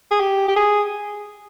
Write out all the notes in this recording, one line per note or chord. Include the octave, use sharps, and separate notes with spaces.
G#4
G4
G4
G#4